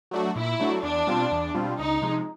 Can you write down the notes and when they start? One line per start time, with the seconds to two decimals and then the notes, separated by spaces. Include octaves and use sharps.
0.11 F#3 A3 D4 F#4
0.36 A#2 E4
0.60 F#3 A3 D4 F#4
0.83 E2 D4
1.07 B2 G3 C4 F4
1.31 E2
1.54 B2 G3 C4 F4
1.78 C#2 D#4
2.02 C3 F3 G#3